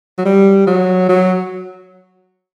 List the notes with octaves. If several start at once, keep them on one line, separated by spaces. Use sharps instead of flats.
F#3
G3
F#3
F#3